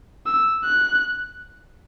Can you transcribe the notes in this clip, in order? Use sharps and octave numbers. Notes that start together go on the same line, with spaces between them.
E6
F#6